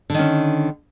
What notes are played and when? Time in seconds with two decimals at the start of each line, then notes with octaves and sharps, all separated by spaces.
0.10 D3
0.14 D#3
0.19 C#4